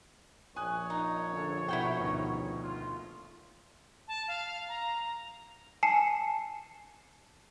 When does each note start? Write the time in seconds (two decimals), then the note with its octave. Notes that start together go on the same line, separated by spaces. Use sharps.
0.56 A#1 C#5 G#5 D#6 F#6
0.90 D#4
1.33 D3 A4
1.68 B2 E4 F#4 G5
1.98 D2 B2 D#3
2.63 F4
4.08 A5
4.28 F5
4.69 A#5
5.83 G#5 A5 C7 C#7